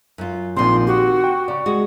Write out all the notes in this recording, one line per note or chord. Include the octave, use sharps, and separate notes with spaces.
F#2 F4
A#1 A#2 D#3 C4 C6
F#4 G4 D6
G5
C#3 D5 C#6
G#3 F#4